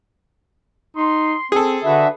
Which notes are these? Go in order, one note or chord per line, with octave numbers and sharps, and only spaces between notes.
D#4 C6
C4 G#4 A4
D3 D4 F#4 B4 E5